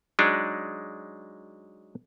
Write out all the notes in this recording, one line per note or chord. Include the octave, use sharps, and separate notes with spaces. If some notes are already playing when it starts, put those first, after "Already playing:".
F#3 G#3 D4 D#4